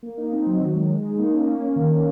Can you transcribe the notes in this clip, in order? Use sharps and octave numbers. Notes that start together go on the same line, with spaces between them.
A#3
D#4
C4
F#3
D#3
G#3
G#3
D#4
A#3
C#4
A#3
A#3
D#3
C#4